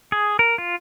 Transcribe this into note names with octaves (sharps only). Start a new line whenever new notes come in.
G#4
A#4
F4